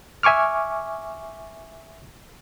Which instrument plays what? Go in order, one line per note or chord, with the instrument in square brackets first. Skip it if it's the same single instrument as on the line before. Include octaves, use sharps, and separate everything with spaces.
[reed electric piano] E5 G#5 C#6 D6 F6